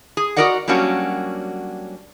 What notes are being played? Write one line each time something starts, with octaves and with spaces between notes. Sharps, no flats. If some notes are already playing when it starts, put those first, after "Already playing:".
G#4
F#4 G#4 A#4 D5 D#5 F#5
F#3 G3 A#3 C#4 D4 F#4